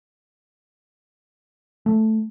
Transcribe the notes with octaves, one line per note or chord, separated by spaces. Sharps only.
A3